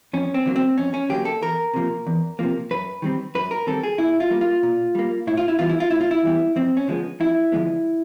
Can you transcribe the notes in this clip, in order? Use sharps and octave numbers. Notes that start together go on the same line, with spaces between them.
F2 C#4
C4
D3 F#3 A#3
C4
F2 C#4
C#4
D3 F#3 A#3 G4
A4
E2 A#4
C3 F3 A#3
E2
C3 F3 A#3
F#2 B4
D#3 G3 C4
F#2 B4
A#4
D#3 G3 C4 A4
G#4
A#2 E4
F4
G3 A#3
F4
A#2
G3 A#3
A2 E4
F4
E4
E3 G3 B3 F4
E4
F4
A2 E4
F4
E4
E3 G3 B3
F2 C4
C#4
D3 F3 G#3 B3
F2 E4
D3 F3 G#3 B3